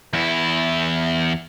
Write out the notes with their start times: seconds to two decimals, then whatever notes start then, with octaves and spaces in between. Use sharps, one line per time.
0.13 E2 E4